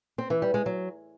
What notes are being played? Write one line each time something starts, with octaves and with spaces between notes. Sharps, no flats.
C4
E3
G3
G#3
F#3